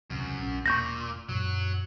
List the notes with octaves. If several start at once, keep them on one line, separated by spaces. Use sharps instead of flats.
E1 C#2 F#2 C3
A#1 C#4
E1 A#2 C#6 G6 A#6
F#2 A#2 F#3